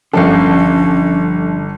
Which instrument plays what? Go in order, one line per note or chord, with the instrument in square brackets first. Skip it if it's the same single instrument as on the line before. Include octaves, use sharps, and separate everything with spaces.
[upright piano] G1 A4 [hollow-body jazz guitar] D3 F3 F5 [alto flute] C#4